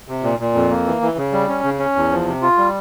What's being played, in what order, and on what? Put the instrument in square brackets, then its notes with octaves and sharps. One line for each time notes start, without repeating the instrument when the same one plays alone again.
[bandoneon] C3
A#2
A#2
F2
A#3
E3
E3
C#3
G3
C#4
C#3
C#4
E2
F3
C3
F4
G3